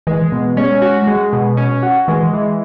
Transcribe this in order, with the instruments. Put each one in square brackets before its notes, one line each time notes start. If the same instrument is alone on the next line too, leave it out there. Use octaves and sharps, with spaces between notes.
[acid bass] E3 [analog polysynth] G#3
[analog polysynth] B2
[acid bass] G#3 [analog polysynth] C#4
[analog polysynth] F#4
G#3
B2
C#4
F#4
[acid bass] E3 [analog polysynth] G#3
[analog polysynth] E3